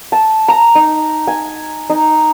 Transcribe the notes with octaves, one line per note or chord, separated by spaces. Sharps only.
A5
A#5
D#4
G#5
D#4